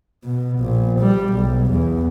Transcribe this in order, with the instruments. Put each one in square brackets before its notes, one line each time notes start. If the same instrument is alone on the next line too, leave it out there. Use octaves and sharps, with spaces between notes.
[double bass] B2
A#1
G3
B1
E2